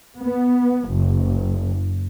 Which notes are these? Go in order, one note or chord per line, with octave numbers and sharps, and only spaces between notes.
B3
F#1